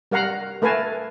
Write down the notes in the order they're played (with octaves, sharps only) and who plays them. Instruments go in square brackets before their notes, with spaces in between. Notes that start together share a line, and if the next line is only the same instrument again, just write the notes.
[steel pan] G3 A#4 F5 F#5 A#5
A3 A#4 B4 F5 G#5 A5